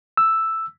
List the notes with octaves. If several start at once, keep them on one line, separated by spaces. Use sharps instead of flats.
E6